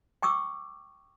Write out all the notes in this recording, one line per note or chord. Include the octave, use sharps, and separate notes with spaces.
G5 C#6 D6 E6